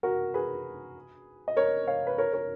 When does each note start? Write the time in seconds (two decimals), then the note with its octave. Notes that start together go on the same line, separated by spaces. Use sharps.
0.03 F#4 A#4
0.34 G#4 B4
1.48 D#5
1.56 A#4 C#5
1.87 C#5 F5
2.07 B4
2.18 A#4 C#5
2.33 A#4 C#5